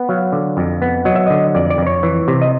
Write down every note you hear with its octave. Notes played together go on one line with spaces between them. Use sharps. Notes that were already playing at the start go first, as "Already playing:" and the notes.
Already playing: B3
F#3 F5
D3
F2
B3
F#3 D#5
E5
D3 D#5
F2 D5
D5
F2
C#5
E3
C3
D#5